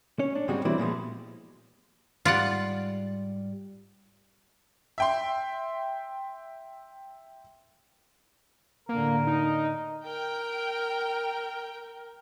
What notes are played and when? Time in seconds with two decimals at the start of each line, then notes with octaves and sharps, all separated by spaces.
0.19 C#4 C#5
0.35 D4
0.48 G#2 C#3 G3 G#3 C4 F#4
0.65 E3 G3 C4 E4 F#4 D5
0.78 A#2 F3 G#3 B3
2.25 G#2 G3 F4 D5 F#5
4.98 E5 G5 C6
8.89 A2 D3 A#3 A#4
9.27 D#4
10.06 A#4 G5